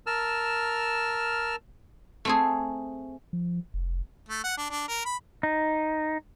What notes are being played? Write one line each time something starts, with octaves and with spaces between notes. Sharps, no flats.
A#4 A5 E6 F6
A3 C4 G#4
F3
F1
A3
F#5
D4
D4
A#4
B5
D#4